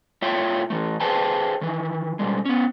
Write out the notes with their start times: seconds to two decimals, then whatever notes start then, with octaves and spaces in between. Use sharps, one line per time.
0.22 A2 F4 C#5 E5 G5
0.70 E3 A3
1.00 G#4 B4 C5 G5 A5
1.61 D#3 E3
2.19 B2 G3 G#3
2.45 B3 C#4